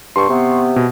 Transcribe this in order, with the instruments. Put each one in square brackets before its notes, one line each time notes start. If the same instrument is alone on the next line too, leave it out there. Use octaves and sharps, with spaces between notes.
[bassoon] G2 [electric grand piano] C6 C#6
[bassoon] C3 [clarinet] B3
[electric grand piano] B2